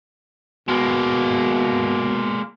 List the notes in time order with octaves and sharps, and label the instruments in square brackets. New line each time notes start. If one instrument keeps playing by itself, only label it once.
[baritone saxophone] B2 [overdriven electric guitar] G#3 A#3